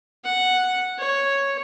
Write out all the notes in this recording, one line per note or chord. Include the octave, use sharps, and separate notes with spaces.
F#5
C#5